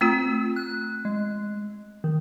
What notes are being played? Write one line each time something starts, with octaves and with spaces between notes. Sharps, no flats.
A3 C4 F4 E6
F#6
G#3
D#3